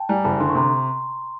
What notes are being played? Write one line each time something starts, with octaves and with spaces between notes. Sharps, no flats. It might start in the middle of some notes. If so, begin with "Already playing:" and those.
Already playing: G5 A5
G3 G#5 A#5
F#1 A5 B5
D3 C6
C#6
C3 A#5 C6